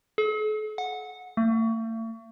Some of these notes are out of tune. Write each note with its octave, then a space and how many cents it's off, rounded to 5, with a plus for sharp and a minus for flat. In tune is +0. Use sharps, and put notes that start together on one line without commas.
A4 -45
F#5 -15
A3 +40